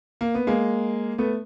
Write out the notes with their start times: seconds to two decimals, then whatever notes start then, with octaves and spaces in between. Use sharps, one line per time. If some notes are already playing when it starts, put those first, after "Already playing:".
0.21 A#3
0.34 B3
0.47 G#3 A#3
1.18 A3 B3